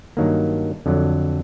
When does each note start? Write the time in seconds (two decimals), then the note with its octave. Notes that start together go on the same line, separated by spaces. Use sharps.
0.17 G2 D#3 F#3 A#3
0.86 F2 D3 F#3